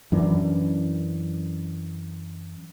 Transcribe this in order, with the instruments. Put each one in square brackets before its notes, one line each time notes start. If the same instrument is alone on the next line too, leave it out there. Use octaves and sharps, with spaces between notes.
[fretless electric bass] F#2 E3 D4